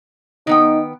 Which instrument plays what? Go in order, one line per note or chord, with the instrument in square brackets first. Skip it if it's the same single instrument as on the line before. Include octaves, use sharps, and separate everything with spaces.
[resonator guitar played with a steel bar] D#3 B3 G5 [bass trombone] D#4